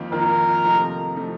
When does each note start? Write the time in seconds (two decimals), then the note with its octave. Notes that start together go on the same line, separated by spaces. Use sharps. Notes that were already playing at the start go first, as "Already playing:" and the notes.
Already playing: F2 D#3 A#3 F4
0.12 F2 D#3 A#3 F4 A#4
0.64 C3 F3 A3 D#4
1.16 C3 F3 A3 D#4